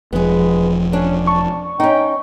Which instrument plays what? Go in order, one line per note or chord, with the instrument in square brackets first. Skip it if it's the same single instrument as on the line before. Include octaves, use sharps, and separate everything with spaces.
[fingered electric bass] E1 F3 [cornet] G#3 [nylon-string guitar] B3 G#4
[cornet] C#4 [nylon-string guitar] D4
[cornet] A5 [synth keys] C#6
[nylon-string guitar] C#4 D#4 [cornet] G5